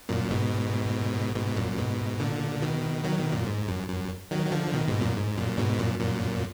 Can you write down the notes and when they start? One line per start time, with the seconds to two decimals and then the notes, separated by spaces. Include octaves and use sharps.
0.09 F#2 A#2
0.30 G#2 B2
1.36 G#2 B2
1.56 F#2 A#2
1.78 G#2 B2
2.20 A#2 D3
2.62 B2 D#3
3.04 D#3 F#3
3.19 B2 D#3
3.32 F#2 A#2
3.46 G#2
3.68 F#2
3.89 F#2
4.31 D#3 F#3
4.46 F#3
4.52 D3 F3
4.73 B2 D#3
4.87 G#2 B2
5.01 F#2 A#2
5.16 G#2
5.37 F#2 A#2
5.58 G#2 B2
5.79 F#2 A#2
5.99 F#2 A#2